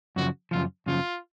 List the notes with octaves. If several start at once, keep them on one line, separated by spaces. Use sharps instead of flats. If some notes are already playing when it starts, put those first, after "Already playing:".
F#2 C#3 F3 F#4
F#2 C#3 F3 F4
F#2 C#3 F3 F4